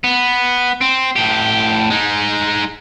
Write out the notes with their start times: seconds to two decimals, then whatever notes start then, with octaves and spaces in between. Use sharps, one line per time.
0.04 B3
0.81 C4
1.16 A2 G4
1.90 G#3 D#4